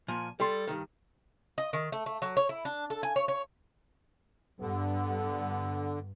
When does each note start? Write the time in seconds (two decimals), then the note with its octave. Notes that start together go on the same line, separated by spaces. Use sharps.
0.08 A#2 F3 G#5
0.40 G3 A4 C6
0.67 G2 D#3
1.58 D#5
1.73 D#3
1.92 A3
2.06 A3
2.22 F#3
2.37 C#5
2.49 E4
2.65 D4
2.90 A4
3.03 G#5
3.16 C#5
3.28 C#5
4.60 G2 D3 B3